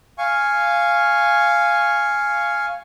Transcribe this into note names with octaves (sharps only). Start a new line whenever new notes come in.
F5 G#5 C#6